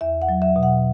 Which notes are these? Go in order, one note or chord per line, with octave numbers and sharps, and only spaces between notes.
E2 E5
F#5
F#3
E5
B2
F#5